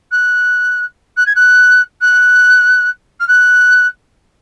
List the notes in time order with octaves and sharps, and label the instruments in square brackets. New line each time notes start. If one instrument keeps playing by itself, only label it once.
[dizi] F#6
F#6
G#6
F#6
F#6
F6
F#6